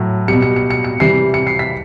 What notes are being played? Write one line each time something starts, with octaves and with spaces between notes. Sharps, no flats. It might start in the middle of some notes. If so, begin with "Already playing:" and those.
Already playing: A2 F#3
B2 G3 C#7
C#7
C#7
C#7
C#7
C3 E3 G3 C7
C#7
C7
B6